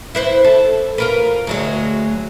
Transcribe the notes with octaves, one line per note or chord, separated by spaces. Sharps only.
E4 B4 C5
A4
F4 A#4 B4
D2 F#3 G#3